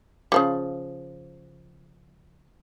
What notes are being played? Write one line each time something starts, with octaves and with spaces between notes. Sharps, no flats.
C#3 F3 G3